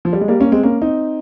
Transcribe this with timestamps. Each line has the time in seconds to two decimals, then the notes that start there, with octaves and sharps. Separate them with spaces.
0.05 F3
0.13 G3
0.21 G#3
0.28 G3 A#3
0.40 A#3 C#4
0.52 G#3 C4
0.63 A#3 C#4
0.82 C4 D#4